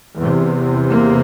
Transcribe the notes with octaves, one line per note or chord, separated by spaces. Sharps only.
E2 C3
A#3